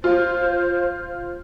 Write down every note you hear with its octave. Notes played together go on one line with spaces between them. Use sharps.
F4 C5